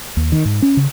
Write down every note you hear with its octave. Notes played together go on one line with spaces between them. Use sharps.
D#2
D#3
G#2
C#4
C#3